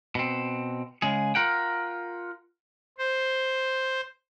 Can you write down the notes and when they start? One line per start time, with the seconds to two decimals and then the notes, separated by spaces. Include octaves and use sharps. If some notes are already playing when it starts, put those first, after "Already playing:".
0.15 B2 C4
1.02 C#3 G#3 G#4
1.35 F4 A#4 F#5 G5
2.98 C5